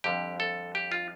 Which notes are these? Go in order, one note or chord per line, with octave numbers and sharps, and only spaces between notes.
F2 D3 G3 G4
A4
G4
F4